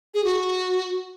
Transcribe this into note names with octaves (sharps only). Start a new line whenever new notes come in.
G#4
F#4